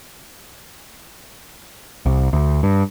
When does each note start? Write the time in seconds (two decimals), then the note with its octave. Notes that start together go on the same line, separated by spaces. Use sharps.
2.06 C2
2.33 D2
2.63 G2